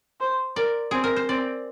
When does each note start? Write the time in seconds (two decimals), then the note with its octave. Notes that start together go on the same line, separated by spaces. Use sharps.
0.20 C5
0.56 A#4 D5
0.91 C4 G#4
1.04 A#4
1.16 C5
1.29 C4 D5